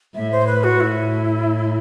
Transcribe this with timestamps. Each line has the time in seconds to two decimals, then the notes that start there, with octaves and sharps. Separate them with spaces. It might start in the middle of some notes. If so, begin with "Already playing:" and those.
0.15 A2 E5
0.32 C5
0.47 B4
0.64 F#4
0.80 A2 E4